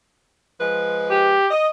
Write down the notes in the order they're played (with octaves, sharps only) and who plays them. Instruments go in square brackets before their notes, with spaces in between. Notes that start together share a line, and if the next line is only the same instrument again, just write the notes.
[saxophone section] F3 G#3 B4
[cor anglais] G4
[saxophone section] D#5